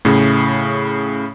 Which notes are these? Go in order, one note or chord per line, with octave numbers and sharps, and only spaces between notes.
A2 C#3